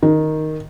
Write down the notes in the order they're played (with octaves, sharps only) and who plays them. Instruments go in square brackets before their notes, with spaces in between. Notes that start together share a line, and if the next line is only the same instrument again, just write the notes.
[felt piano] D#3